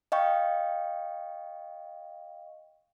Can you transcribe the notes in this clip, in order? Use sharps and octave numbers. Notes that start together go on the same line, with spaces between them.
D#5 F5 G5 C#6